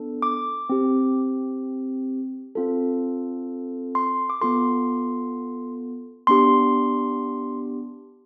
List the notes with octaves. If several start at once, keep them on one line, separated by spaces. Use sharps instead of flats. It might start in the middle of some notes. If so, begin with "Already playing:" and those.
Already playing: B3 D4 A4
D6
C4 G4
C4 F4 A4
C6
D6
B3 F4 A4 C6
B3 D4 G4 C6